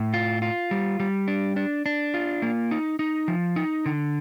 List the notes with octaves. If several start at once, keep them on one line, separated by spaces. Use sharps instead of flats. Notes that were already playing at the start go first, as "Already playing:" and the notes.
Already playing: A2
F4
F4
G3
G3
D4
D4
D4
F4
A#3
D#4
D#4
F3
D#4
D3